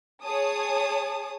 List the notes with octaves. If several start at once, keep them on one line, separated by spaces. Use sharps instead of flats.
G#4 C#5 A5 D#6